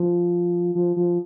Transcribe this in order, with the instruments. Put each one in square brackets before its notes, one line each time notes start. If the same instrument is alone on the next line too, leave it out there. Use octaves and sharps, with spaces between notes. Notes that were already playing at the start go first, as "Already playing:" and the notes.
Already playing: [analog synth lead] F3
F3
F3